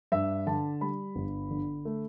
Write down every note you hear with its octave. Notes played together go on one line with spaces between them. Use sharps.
G2 E5
D3 A5
G3 B5
G1
D3
A3